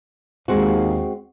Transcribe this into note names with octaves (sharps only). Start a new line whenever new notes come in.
D#2 G#3 C4 F#4